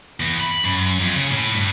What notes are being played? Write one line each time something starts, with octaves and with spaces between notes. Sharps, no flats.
E2
B5
F#2
F2
C#3
A2
G2